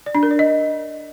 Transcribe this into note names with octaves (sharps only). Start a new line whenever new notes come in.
D5
D4
A#4
D5
D#5